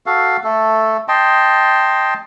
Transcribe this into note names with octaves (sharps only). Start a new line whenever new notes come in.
F#4 A4 F5
A3 A4
D#5 G5 A5 C6